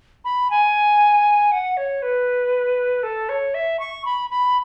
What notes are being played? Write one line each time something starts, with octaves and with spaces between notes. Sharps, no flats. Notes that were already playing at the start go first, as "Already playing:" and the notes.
B5
G#5
F#5
C#5
B4
A4
C#5
E5
C#6
B5
B5